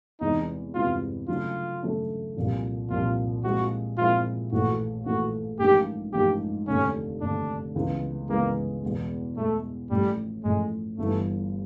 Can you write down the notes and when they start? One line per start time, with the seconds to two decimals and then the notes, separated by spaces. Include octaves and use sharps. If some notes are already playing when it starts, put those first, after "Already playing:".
0.21 E2 C3 E3 G#3 D#4
0.74 E2 C3 E3 G#3 F4
1.28 C#3 F#3 A3 D4 F4
1.82 C#3 F#3 A3 D4
2.36 C2 A#2 F3
2.90 C2 A#2 F3 F4
3.44 A#2 F3 G#3 C4 E4 F#4
3.98 A#2 F3 G#3 C4 E4 F4
4.52 A#1 A2 E3 A3 F#4
5.05 A#1 A2 E3 A3 F#4
5.60 A1 G#2 F3 A#3 D4 G4
6.13 A1 G#2 F3 A#3 D4 G4
6.67 F1 D#2 D3 C#4
7.21 F1 D#2 D3 D4
7.75 C#2 C#3 E3 G#3 B3
8.29 C#2 C#3 E3 G#3 A#3 B3
8.83 E2 B2 G#3
9.36 E2 B2 G#3 A3
9.90 A1 A2 F3 G3
10.44 A1 A2 F3 G#3
10.98 G1 G2 E3 A3